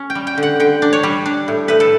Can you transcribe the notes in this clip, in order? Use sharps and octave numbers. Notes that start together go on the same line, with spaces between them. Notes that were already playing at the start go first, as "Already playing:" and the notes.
Already playing: C#4
G5
G3
G5
D3
F#5
D3 G5
D4
C#5
G3
D4
A2
A2 B4
A4